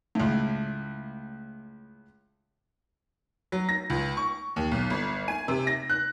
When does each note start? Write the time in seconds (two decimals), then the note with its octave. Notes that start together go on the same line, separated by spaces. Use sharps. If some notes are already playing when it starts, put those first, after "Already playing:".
0.15 C#2 A2
3.52 F#3
3.69 A#6
3.90 C#2
4.17 C#6
4.56 D#2
4.71 B1
4.90 G1
5.28 G#5
5.48 C3
5.67 A#6
5.89 F#6